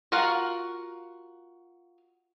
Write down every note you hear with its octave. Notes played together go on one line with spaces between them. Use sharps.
F4 F#4 A#4 F5 F#5